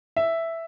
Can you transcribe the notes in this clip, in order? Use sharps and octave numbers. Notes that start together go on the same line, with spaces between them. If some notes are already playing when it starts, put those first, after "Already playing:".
E5